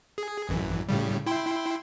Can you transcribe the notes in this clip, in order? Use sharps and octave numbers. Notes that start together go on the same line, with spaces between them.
G#4
A1 F#2 E3
A2 C#3 G3
E4 G5 C6